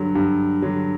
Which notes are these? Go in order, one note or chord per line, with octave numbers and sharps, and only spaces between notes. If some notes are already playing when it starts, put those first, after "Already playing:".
Already playing: G2 D3 F#3
G2
D3 F#3